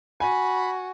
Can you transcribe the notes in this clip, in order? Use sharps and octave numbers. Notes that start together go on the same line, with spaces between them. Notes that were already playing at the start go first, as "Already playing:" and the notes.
F#4 G#5 B5